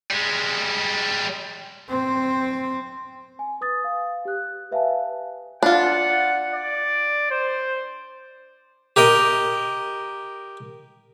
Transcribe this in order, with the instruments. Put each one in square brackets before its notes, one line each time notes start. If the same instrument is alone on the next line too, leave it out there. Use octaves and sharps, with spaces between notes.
[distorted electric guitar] G3 G#3
[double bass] C4
[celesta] G#5
B4 D#6 A6
F5
G4 F#6
B4 E5 F5 G#5 A5
[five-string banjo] D4 F4 [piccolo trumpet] F#5
[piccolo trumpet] D5
C5
[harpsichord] G4 A#4 D#5